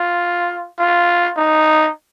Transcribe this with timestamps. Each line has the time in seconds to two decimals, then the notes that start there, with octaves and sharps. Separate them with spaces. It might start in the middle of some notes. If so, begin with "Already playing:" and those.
Already playing: F4
0.79 F4
1.37 D#4